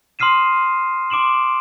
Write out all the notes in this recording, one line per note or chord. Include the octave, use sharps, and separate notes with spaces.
C6 D#6 F6 C7 D#7 E7
C6 D6 D7 E7 F#7